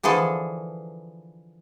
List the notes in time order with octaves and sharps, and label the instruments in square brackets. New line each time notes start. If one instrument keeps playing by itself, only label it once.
[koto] D3 E3 F3 G#4 A4